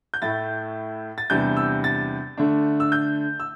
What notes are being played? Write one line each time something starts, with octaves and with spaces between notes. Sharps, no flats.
G6
A2 A3 E4 A6
A6
E2 C3 G3 D4 G6
E6
A6
D3 A3 D4
E6
G6
E6